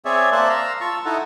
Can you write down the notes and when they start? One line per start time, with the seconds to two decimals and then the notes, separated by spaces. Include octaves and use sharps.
0.05 C4 G#4 C#5 D5 E5
0.32 A#3 C5 D5 E5 A5 F#6
0.50 F5 A#5 E6
0.81 F4 A5 C#6 E6
1.05 D#4 E4 A4 D#5 F#5